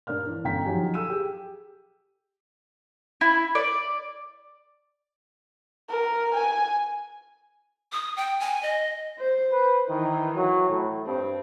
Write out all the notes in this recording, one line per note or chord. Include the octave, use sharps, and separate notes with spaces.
G2 A#4 D5 F6
E3 D4
G1 F#2 G5 A#5 B6
F3 F#3 D#4 G4 G#5
A4 E6 D#7
G4 G#4
E4
D5
A#4
G#5
D#6
G5
G#5
D#5
C5
B4
D#3 E3
F#3
A2
G2 C4